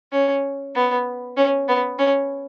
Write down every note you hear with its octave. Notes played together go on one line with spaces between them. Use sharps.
C#4
B3
C#4
B3
C#4